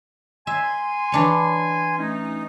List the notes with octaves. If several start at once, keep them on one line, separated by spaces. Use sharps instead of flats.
E5 G#5 C6
E3 D4 C#5
A3 C#4 D#4